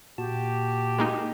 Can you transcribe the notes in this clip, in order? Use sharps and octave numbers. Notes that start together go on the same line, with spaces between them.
A#2 F#4 G4 A5
G#3 A#3 D#4